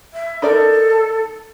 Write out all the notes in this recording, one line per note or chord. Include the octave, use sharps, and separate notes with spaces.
E5
D#4 A4 A#4 D5